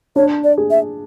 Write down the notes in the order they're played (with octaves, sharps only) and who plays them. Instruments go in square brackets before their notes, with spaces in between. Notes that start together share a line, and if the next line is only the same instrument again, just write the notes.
[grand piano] D4 [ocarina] C#5
[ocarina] D5
[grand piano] G#4
[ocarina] E5